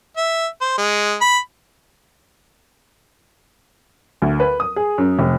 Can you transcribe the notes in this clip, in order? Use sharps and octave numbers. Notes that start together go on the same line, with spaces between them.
E5
C5
G#3
B5
D2
B4
D#6
G#4
F#2
F1